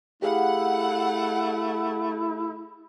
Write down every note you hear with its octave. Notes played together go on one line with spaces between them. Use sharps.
A3 E4 G4 G#4 F5 F#5